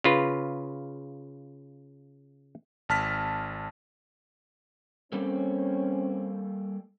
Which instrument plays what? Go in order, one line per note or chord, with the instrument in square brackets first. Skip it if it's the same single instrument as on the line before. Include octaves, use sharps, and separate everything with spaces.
[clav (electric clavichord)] C#3 F4 B4
[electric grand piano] G#1 A5 F6 B6
[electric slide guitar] G3 A#3 A4 [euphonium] C4 [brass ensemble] C#4